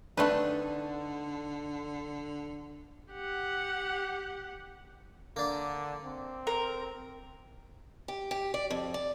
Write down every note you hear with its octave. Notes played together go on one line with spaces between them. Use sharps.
D3 A3 C4 D4 D#4 B4
G4 F#5
D3 A#3 D4
C4
A#4
G4
G4
D5
F2
D5